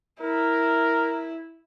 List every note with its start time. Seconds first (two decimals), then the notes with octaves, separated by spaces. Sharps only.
0.21 E4 A#4